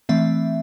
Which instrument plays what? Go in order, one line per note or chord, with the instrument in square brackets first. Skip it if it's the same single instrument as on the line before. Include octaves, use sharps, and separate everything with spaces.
[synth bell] E3 A3 C4 E5